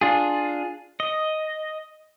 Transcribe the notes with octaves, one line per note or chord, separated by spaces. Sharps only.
D4 F4 G#4
D#5